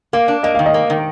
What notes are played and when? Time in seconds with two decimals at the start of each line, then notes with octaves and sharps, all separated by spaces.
0.13 A#3 F5
0.28 D4
0.43 A#3 D#5
0.55 D#3 F5
0.66 D#5
0.74 A#3
0.90 D#3